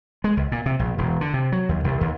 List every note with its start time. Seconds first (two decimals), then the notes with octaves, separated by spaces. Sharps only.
0.24 G#3
0.37 C#2
0.52 A#2
0.66 C3
0.79 A#1
0.98 E1
1.21 D3
1.34 C3
1.52 F#3
1.69 D#2
1.84 C2
2.01 D#2